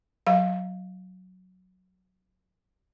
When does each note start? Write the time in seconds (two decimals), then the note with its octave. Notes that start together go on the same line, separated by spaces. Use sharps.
0.27 F#3 F5